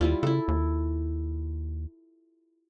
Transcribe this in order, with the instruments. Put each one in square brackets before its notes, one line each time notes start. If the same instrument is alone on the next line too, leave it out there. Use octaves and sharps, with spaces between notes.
[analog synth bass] D#2 [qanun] G3 E4 F4
[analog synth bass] C#3 [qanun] E4 A4
[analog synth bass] D#2